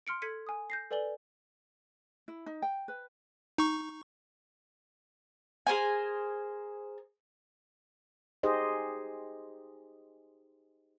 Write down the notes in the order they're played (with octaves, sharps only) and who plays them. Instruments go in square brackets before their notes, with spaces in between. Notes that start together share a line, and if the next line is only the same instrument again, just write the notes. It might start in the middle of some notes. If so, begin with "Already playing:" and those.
[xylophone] C6 F6 C#7 D7
A4 G#6 B6 C#7 D#7
G#5 D#6
G6 A#6 C7
A4 B4 D5 G#5 F#7 G7
[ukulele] E4
D#4
G5
B4
[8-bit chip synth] D#4 C#6
[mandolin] G#4 A#4 C5 G#5
[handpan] D#4 G4 G#4 C5 D#5